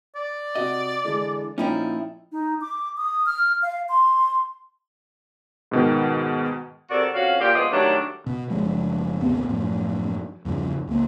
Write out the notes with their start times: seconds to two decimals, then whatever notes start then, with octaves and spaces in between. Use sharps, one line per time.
0.15 D5
0.55 C3 F#4 D#5
1.04 D3 E3 G#3
1.58 A#2 F3 C#4 D#4 E4 G5
2.32 D#4
2.61 D6
2.97 D#6
3.26 F6
3.62 F5
3.89 C6
5.71 G#2 B2 D#3
6.90 C3 F#4 A4 A#4 D5
7.14 F2 C#4 F#4 F5
7.40 A#2 G4
7.55 F3 G#3 B3 F4 D#5
7.72 D#3 F#3 G3 A3 D4
8.26 B2
8.50 F#1 F3 G#3
9.22 A1 D#2 C3 B3
9.49 F#2 A2 F3
10.45 E2 G2 C#3 F3
10.87 C#2 A#3